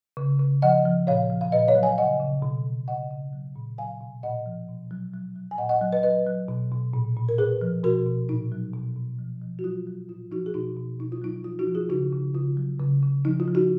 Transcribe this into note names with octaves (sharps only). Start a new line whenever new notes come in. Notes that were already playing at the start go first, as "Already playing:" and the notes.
C#3
C#3
F3 D#5 F#5
F3
A#2 C#5 F5
F3
F5
A#2 B4 D#5
C#5 F5
F#3
F5 G#5
C#3 D#5 F#5
C#3
B2
B2
C#3 D#5 F#5
C#3
F#3
A#2
F#3 F5 G#5
B2
A#2 D#5 F#5
F3
B2
F#3
F#3
F#3
G#5
A#2 D#5 F#5
D#5 F#5
F#3
B4 D#5
F#3 B4 D#5
F#3
B2
B2
A#2
A#2
A#4
A#2 G#4 B4
F3
B2 F#4 A#4
B2
A#2 D#4
F#3
B2
B2
F3
F3
F#4
F#3 F4
F#3
A#2 F4
F3 D#4 F#4
G#4
B2 D#4 F#4
B2
B2 D#4
F4
F#3 D#4
F3 F4
D#4 F#4
F3
F4 G#4
C#3 D#4 F#4
C#3
C#3 F4
F#3
C#3
C#3
F3 D#4
F4
F3
D#4 F#4